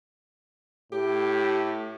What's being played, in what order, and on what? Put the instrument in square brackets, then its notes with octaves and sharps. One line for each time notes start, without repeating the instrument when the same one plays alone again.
[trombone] A2 [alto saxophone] G4